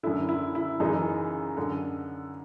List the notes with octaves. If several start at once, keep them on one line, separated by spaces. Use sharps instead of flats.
F#2 D3 E4
E4
E4
F#2 C#3 E3 D#4
F#2 D3